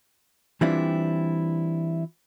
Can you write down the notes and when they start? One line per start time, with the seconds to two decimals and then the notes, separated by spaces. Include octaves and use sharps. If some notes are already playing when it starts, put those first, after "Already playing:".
0.61 E3 G3 C4 D4 E4 F4